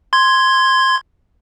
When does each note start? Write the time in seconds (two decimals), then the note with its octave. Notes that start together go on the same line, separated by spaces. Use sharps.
0.13 C6 G#6